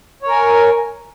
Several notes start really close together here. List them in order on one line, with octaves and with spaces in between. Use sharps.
C#5 A#4 G#5